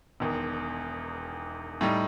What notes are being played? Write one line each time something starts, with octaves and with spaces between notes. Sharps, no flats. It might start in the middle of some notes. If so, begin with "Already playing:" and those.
E1 E2 D#3
A2 G3 D#4